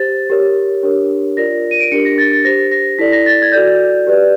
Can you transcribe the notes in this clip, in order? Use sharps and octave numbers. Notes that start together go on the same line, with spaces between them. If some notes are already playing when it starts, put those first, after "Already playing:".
Already playing: G4 C5 A6
G4 A#4 C#5
D4 G4 A#4 C#5
F4 A#4 D5 A#6
D#7
D7
D4 G4 A#4 C#7
A#6
A6
A6
G4 C5 A#6
A#6
E4 A4 D5 B6
A#6
A6
G#6
F#4 A4 D5 G6
G4 B4 D5